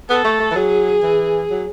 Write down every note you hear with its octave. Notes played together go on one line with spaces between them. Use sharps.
B3 A4
A3
A3
E3
F#3 G#4
E3
F#3